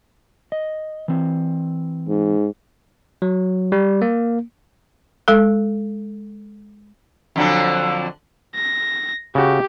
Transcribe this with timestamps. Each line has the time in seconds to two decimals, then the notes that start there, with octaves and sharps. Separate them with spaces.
0.52 D#5
1.08 E3 C4
2.08 G#2
3.22 F#3
3.72 G3
4.02 A#3
5.28 G#3 A4
7.36 F2 D3 F#3
8.55 A#6
9.35 C#3 F#4 G4